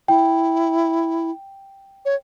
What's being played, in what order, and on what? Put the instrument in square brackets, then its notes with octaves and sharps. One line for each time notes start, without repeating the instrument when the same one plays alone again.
[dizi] E4 [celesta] G5
[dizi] C#5